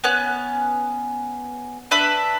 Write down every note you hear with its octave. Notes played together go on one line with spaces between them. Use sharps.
B3 C#4 F#6
D4 B4 E5 B5